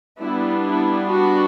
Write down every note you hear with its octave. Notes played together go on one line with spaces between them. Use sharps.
G3 B3 D4 E4
E4
F#4